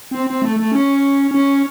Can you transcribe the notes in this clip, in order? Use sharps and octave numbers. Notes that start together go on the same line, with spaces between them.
C4
C4
A3
A3
C#4
C#4